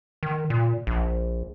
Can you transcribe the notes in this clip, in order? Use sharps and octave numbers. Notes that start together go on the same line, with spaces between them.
D#3
A#2
A#1